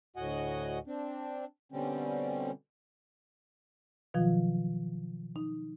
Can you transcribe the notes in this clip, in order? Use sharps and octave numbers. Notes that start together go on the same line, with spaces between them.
D2 A2 F#4 D#5 F#5 G#5
C4 D4
B2 D3 G3 C4 C#4
B2 D#3 F3 F#3 F4
D#4